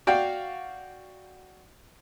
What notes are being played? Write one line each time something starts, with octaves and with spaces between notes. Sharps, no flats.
F#4 D5 F5 G5